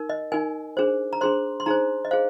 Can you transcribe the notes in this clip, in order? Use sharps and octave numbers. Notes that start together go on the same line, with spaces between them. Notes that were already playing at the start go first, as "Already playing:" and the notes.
Already playing: D#4 A#4
D#5
D#4 A#4 G#5
D4 G#4 C5
A#5
D4 G#4 C5 C6
C6
D#4 G#4 C5 A#5
D#5
G#4 C5 F5